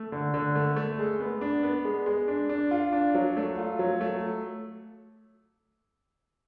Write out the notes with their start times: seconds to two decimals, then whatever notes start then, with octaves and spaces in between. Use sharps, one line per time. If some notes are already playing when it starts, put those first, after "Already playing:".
Already playing: A3
0.12 D3
0.34 D3
0.56 A3
0.76 A3
0.99 G#3
1.20 B3
1.41 D4
1.63 B3
1.85 G#3
2.06 G#3
2.28 D4
2.49 D4
2.71 F4
2.92 D4
3.14 F#3
3.37 A3
3.58 F4
3.79 F#3
4.01 A3